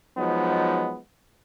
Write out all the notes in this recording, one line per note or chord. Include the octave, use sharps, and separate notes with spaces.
F3 F#3 G#3 B3 D#4